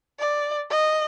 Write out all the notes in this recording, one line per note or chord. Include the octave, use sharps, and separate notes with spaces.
D5
D#5